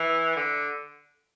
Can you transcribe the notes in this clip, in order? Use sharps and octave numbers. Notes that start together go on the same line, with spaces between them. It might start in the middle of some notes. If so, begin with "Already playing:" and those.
Already playing: E3
D3